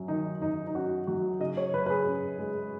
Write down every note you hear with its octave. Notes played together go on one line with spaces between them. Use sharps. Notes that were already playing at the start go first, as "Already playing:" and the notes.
Already playing: F#2 F#3 C#4
D#3 D#4
F#2 D#4
D#4
C#4 F#4
F#3 F#4
C#3 D#5
C#5
F#2 B4
B4
G#4
C#4
G#3